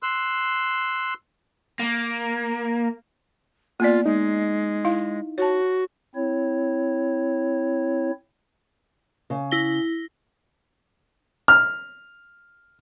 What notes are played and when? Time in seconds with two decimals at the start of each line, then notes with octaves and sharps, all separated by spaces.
0.03 C6 E6 F#6
1.80 A#3
3.80 A#3 B3 F4 D5
4.06 G#3 D#4
4.85 E4 F5
5.38 F#4 C#5 A5
6.15 C4 E4 C#5
9.30 C#3
9.51 E4 A#6 G7
11.48 F6